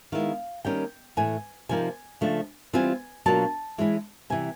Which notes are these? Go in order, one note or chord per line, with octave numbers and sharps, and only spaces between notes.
D#3 G#3 B3 E4 F5
D#3 G3 A#3 C#4 G5
A2 E3 A3 G#5
C3 F3 A#3 D#4 G#5
C#3 F3 A3 D4
E3 G3 C4 F4 G#5
B2 F#3 A#3 D4 F4 A5
E3 G#3 C#4 E4
C3 E3 G3 G#5